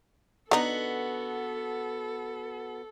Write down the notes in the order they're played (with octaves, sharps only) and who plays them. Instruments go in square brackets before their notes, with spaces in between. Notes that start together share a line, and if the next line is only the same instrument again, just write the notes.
[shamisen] D3 D#4 [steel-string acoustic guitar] B3 F#4 [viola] A4